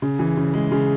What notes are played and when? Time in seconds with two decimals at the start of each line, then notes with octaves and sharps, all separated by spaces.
0.02 C#3
0.19 E3
0.37 C#3
0.54 G#3
0.72 C#3